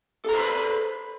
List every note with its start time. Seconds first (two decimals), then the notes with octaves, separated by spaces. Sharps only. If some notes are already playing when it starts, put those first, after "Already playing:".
0.25 A4
0.29 A#5
0.33 C5
0.37 B4
0.41 B5